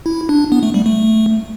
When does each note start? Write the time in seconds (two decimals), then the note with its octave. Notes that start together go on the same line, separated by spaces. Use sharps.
0.06 E4
0.29 D4
0.52 B3
0.63 A3
0.74 G3
0.86 A3